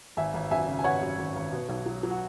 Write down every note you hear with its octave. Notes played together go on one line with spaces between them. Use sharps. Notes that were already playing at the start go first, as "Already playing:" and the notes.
G#1 E5 G#5
G#1
F#2 E5 G#5
C#3
G#5
G#1 C#5 F#5
F#2
G#1
G#1
B2
B1
F#3
F#3
F#4